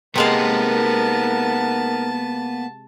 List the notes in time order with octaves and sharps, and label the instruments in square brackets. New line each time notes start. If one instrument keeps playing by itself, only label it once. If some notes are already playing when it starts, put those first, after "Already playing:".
[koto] C3 G#3 F5 [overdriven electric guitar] A#3 B3 [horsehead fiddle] D#4 A#4 [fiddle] A5